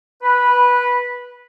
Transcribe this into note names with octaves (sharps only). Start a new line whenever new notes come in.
B4